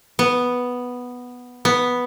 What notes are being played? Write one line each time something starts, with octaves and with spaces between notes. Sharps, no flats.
B3
B3